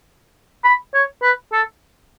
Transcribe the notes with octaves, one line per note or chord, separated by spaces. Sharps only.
B5
C#5
B4
A4